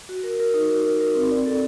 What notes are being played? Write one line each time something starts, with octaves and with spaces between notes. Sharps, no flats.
F#4
A#4
A#4
D#4
F#4
A#4
A#4
C4
D5
A4